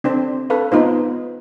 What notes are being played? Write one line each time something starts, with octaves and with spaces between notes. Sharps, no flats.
C4 D4 C5
A4 B4 F5
B3 D#4 F4 C5